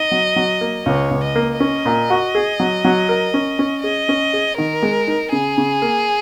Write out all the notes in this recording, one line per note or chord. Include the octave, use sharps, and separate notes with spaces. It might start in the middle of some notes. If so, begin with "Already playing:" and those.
Already playing: D#4 D#5
F#3
F#3
A#3
C#2 C#5
C#2
D#5
A#3
C#4 D#5
A#2
F#4
G#4
F#3
F#3
A#4
C#4
C#4
G#4 D#5
C#4
G#4
D#3 A#4
G#3
D#4
C#3 G#4
C#3
A#3